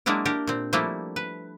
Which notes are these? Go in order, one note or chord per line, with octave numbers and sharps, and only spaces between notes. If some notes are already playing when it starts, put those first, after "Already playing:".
F#3 G#3 A#3 D4 E4 A#4
D4 G4 A#4
A#2 C4
F3 G3 A3 A#3 D4 E4
B4